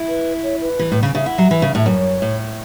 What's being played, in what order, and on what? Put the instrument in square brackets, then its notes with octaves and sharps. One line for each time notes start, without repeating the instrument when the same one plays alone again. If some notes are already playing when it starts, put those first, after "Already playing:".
Already playing: [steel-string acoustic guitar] E4
[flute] B4
C#5
B4
[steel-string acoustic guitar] E3
A2
C#3
[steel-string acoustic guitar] C#3 [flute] E5
[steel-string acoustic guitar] E4 [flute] F#5
[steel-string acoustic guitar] F#3 [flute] E5
[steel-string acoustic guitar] E3
C#3
[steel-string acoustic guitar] A2 [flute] E5
[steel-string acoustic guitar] F#2 [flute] C#5
[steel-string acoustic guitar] A2